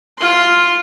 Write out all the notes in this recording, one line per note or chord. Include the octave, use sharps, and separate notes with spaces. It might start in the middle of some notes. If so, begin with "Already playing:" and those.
F4 C6